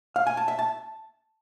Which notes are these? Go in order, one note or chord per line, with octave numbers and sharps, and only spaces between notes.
F5
G#5
A5
E5
A5